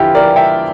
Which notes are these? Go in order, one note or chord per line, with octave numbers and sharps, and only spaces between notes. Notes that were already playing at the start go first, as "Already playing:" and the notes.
Already playing: E2 D3 F3 E4 F4 G4
A#4 D5
E5 G5